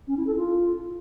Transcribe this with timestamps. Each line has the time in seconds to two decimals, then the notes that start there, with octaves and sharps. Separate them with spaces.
0.08 C#4
0.17 E4
0.27 A4
0.36 F4